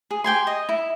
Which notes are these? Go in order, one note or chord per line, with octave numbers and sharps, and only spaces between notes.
G#4
G4 G5 G#5 C6
D#5
E4